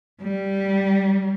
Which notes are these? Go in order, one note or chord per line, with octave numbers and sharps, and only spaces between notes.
G3